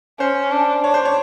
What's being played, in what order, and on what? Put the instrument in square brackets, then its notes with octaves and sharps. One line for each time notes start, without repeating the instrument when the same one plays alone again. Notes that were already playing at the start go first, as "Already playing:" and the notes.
[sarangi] C#4 [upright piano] C5
[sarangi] D4
[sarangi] D4 [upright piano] C#5
[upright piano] C5
C#5